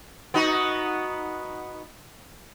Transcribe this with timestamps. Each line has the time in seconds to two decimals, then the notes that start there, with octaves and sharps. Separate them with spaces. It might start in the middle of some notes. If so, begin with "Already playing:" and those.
0.34 B3 D#4 F#4